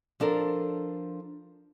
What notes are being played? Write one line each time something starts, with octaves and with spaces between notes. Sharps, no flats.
F3 D4 A4 A#4